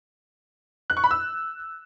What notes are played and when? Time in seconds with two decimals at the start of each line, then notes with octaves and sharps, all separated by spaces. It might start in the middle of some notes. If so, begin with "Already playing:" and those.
0.90 F#6
0.97 C#6
1.04 B5
1.11 E6